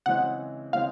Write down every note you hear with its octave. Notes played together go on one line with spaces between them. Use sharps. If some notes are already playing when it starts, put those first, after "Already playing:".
C#3 E3 G#3 C4 F#5
C#3 E3 G#3 C4 F5